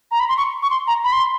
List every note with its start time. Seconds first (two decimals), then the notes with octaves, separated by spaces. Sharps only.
0.11 A#5
0.20 B5
0.29 C6
0.38 C#6
0.62 C#6
0.71 C6
0.87 A#5
1.04 B5
1.13 C6